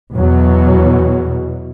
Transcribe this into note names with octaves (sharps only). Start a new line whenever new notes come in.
E2 B2 F#3